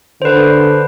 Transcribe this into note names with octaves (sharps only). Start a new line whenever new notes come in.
D3 B4 C5